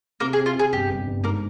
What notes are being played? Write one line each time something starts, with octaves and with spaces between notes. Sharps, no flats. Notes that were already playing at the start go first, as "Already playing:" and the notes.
C3 A#3 A#4
G#4
C4
F4
C3 G#4
G1 G4
G1
G1
G#2 A#3 A#4